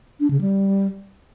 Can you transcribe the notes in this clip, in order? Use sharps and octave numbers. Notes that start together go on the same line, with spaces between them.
D4
C#3
G3